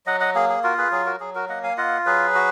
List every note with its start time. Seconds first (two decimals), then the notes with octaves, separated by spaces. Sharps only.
0.06 F#3 D#5 F#5
0.20 D#5 F#5
0.35 A#3 G#4
0.49 G#4
0.63 F4 F#4 A#4
0.78 G#4 B4
0.91 F#3 G#4
1.06 F#4 A#4
1.20 F#3 G#4
1.35 F#4 A#4
1.49 A#3 D#5 F#5
1.63 F5 G#5
1.77 F4 D#5 F#5
2.06 F#3 G#4 B4
2.35 F#4